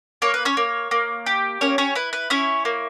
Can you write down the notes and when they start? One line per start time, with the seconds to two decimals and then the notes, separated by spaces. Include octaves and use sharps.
0.22 A#3 C#5
0.34 B4
0.45 C#4 C#5
0.57 A#3
0.91 A#3
1.26 G4
1.61 A#3 C#4 C#5
1.78 C#4 C#5
1.95 E4 B4
2.13 B4
2.30 C#4 E4 C#5
2.65 A#3